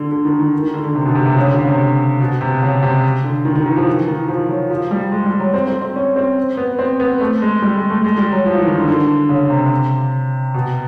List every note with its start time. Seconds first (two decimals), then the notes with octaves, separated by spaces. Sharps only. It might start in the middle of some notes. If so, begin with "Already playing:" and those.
Already playing: D3
0.11 D3
0.25 D#3
0.39 D#3
0.63 D#3
0.74 D3
0.84 D3
0.95 C3
1.06 B2
1.15 C3
1.26 C3
1.36 C#3
1.47 D3
1.57 C#3
1.68 C3
2.20 B2
2.41 C3
2.62 C#3
2.83 C3
3.24 D3
3.45 D#3
3.56 D#3
3.66 E3
3.77 F3
3.87 E3
4.08 D#3
4.28 F3
4.49 F#3
4.70 F3
4.91 G3
5.12 G#3
5.26 G3
5.40 F#3
5.54 C4
5.67 C4
5.82 C4
5.96 C#4
6.16 C4
6.57 B3
6.79 C4
7.00 B3
7.21 A3
7.42 G#3
7.62 G3
7.76 G#3
7.90 A3
8.04 G#3
8.18 G3
8.32 F#3
8.46 F3
8.56 E3
8.66 D#3
8.77 D3
8.88 D3
9.29 C#3
9.50 C3
10.54 B2